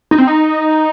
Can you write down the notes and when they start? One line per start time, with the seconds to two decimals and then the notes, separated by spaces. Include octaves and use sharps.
0.11 D#4
0.18 C4
0.27 D#4